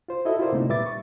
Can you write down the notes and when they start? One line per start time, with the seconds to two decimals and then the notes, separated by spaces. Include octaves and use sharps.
0.08 F4 C5
0.25 E4 F#4 A4 D#5 E5
0.39 E4 F4 G4 A#4 C5 D5
0.53 C3 A3 A#3 D#4
0.69 A#2 G3 B4 E5 D6 A6
0.86 C#6